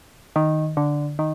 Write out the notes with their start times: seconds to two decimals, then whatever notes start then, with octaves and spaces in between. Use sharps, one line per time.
0.36 D#3
0.77 D3
1.19 D#3